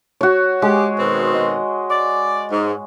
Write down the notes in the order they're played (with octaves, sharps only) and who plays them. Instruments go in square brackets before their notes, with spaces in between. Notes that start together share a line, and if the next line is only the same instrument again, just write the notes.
[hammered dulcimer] F#4 C#5
[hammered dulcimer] G#3 G#4 [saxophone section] G4
[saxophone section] B2 D#3 C4
[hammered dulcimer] D#5
[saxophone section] D5
G#2